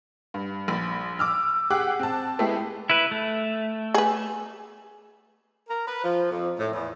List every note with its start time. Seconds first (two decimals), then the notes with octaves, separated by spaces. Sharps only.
0.34 G2
0.68 A#1 B5 A6
1.19 D6 E6 F6
1.70 G4 G#4 F#5 D6 F#6
1.99 C4 A5
2.39 G#3 A3 B3 E4 G4 G#4
2.90 E4 B4
3.11 A3
3.94 G#4 B4
5.69 A#4
5.87 B4
6.04 F3
6.31 F2
6.59 A2
6.72 E2